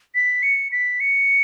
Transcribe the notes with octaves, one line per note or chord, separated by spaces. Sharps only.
B6
C#7
B6
C#7